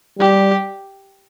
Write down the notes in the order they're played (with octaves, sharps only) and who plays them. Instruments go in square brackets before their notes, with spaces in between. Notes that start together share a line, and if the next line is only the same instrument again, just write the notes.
[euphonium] G3 [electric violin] G4